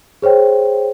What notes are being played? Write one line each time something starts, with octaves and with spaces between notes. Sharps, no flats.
G#4 C5 C#5 G5